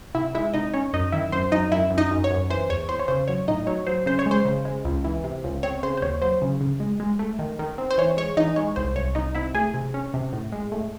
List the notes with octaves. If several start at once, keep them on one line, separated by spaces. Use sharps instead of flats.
C3 E4 E5
G#3 E4 E5
C3 D#4 D#5
C#4 C#5
F#2 D#4 D#5
D#3 E4 E5
F#2 C5
F#2 D#4 D#5
F#2 E4 E5
F#2
D#4 D#5
F#2
C#5
F#2
E3 C5
E2 C#5
E2 C5
C#5
C#3 C5
F#3 C#5
A2 D#4 D#5
F#3 C#5
F#3 C5
C#3 C5
C#5
G#3
C5
C#3
G#3
C#2
E3
C3
C#2
C4 C#5
C#3 C5
C5
D#2 C#5
F#3 C5
C#3
C#3
G#3
G#3
A3
D#3
D#3
C4
C5
E3 C#5
G#3 C#5
E3 D#4 D#5
G#3 C#5
C2 C5
C2 C#5
C2 D#4 D#5
C3 E4 E5
A3 G#4 G#5
C3
C#4
C3
A2
G#3
A2